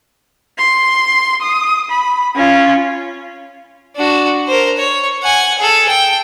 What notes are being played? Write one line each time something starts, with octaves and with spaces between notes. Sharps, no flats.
C6
D#6
B5
C#4 F4
D4 F#4
A#4 C5
C#5
F#5 G#5
G#4 A4
G5